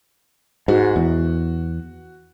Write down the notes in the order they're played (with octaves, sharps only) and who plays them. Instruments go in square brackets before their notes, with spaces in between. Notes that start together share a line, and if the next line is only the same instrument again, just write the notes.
[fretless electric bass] G#2 [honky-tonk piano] F#4
[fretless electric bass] E2